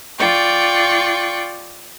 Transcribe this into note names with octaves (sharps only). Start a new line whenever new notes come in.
F4 D5 G5 C#6